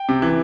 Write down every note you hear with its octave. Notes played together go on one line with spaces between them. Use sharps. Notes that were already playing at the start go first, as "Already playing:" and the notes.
Already playing: G5
C3
E3